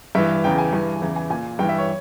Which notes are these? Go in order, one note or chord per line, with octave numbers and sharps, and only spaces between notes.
G2 E3 E5
E2 C#3 E3 G5
G#5
G2 E3
E2 C#3 E3
G#5
A#2 G#5
G2 E3 G5
E5
C#5